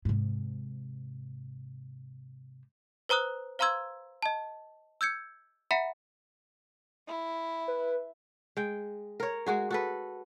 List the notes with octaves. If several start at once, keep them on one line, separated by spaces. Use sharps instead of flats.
G#2 C3
B4 C5 A#5 D#6 F#6
C5 F5 A#5 C6 E6 G#6
D#5 A5
E6 G6 G#6 C#7
E5 F#5 A#5 B5 B6 C#7
E4
B4
G#3 G5
A#4 C#5
G#3 F#4 G#4
F#4 A4 B4